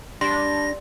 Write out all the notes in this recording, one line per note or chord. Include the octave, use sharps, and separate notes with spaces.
G3 D4 C6 A#6